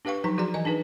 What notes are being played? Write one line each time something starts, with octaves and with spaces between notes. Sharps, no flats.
D4 G4 B4 F5 G5 C#6
F3 F#3 D#4 A#5
F3 F#4 G#4 D5 A#5
E3 D#5 G#5
D4 D#4 G#4 B4